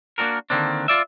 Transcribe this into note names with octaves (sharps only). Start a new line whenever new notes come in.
A#3 B3 D4 F#4 A#4
D3 D#3 A#3 C4 D4
F4 D5 E5